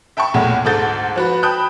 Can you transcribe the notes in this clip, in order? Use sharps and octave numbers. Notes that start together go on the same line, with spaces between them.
E5 G5 A5 B5 C#6
B1 E2 A#2 A3
D2 G#2 D#4 A4 G6 A6
F3 F#4 B4
G5 A5 B5 D#6 F#6 G6